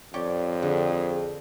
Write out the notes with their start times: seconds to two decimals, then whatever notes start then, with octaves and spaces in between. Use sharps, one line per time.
0.14 F2 G4 C#5 D5
0.62 D3 G#4